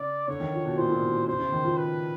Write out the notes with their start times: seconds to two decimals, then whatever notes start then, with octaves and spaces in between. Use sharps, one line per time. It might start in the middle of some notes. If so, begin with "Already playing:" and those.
Already playing: C#3 D5
0.27 D3 C#5
0.40 D#3
0.53 F3
0.65 B2
0.78 A#2 C5
0.85 A2
0.92 A#2
1.03 B2
1.27 C#3 C5
1.39 C#3
1.52 D#3
1.64 F3
1.77 B4